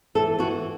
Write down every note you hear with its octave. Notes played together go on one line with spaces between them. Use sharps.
E3 A4
E3 F#4